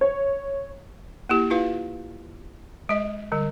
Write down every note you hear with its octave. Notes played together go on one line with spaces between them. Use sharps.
C#5
A#3 E4 G4
E4 F4 B4 F5
G#3 D#5
D3 G3